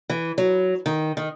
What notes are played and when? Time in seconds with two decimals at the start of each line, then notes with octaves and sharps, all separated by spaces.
0.10 E3
0.38 F#3
0.86 D#3
1.17 D#3